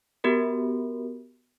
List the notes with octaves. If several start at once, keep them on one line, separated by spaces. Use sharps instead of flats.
B3 F#4 G4 A#4